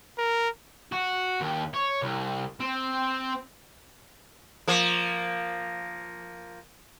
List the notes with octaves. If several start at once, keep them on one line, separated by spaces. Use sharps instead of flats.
A#4
F#4
D#2
C#5
C2
C4
F3 A#3